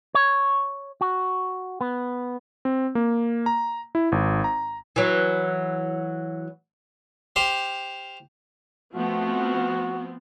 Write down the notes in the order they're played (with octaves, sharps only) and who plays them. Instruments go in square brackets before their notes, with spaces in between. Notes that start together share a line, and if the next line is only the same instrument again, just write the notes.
[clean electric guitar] C#5
F#4
B3
[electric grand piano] C4
A#3
A#5
E4
G#1
A#5
[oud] E3 F#3
[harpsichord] G4 C5 F5 C6
[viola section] F3 B3 C4 [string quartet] A3 [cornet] F#4